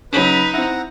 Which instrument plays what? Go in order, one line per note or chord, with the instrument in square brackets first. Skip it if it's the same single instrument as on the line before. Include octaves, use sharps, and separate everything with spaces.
[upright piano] C#3 F#3 [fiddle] D#4 [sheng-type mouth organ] B4 B5
[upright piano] C4 E4 [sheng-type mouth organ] F#5 A#5